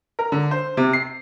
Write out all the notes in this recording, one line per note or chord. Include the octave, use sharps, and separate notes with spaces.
A#4
D3
C5
C3
C7